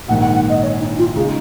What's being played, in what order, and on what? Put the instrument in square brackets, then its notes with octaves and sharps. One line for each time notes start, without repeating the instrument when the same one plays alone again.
[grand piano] A#1 G#2 D#3 [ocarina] F#5
[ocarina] F#5
F#5
D#5
C#5
D#4
F4
[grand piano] C#3 G#3 D#4 [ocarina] G#4